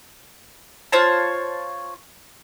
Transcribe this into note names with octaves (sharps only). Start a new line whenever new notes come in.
F4 C5 C#5 A5